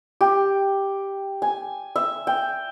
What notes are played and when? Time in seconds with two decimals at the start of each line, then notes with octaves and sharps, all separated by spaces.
0.21 G4
1.42 G#5
1.96 E5
2.27 G5